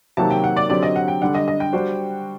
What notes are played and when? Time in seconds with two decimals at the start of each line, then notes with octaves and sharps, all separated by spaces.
0.17 C3 D#3 F#3 A#3 F#4 A5
0.31 G5
0.44 F#5
0.57 D5
0.69 D3 F#3 C4 G4 D5
0.83 D#5
0.96 F#5
1.08 G5
1.22 D3 G3 D4 F#5
1.35 D#5
1.48 D#5
1.60 G5
1.73 G3 D4 F#4 C5